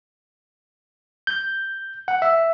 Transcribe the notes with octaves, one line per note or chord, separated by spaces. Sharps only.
G6
F#5
E5